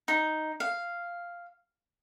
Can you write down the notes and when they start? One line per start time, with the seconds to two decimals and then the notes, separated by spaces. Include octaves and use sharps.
0.08 D#4
0.60 F5